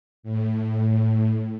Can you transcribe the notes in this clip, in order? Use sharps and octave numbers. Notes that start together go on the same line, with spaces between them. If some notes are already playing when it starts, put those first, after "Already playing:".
A2